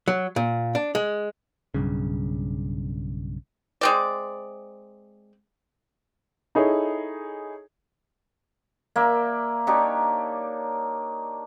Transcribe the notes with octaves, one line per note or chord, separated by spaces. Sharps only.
F#3
A#2
D4
G#3
B1 G2 C#3
G#3 C4 D5
D#4 E4 G#4 A4 C#5
A#3 D5 E5
D4 D#4 G4 C#5